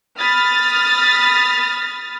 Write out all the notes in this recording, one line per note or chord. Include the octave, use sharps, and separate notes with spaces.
B5 D#6 F6 A6